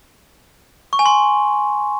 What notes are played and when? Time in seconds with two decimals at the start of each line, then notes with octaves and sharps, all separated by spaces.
0.93 C#6
0.99 G#5
1.06 C6